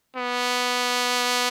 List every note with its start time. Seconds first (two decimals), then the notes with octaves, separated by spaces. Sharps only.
0.16 B3